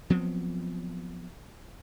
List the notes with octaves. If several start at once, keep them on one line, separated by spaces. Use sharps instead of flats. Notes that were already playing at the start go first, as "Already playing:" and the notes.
F3 F#3 B3 C4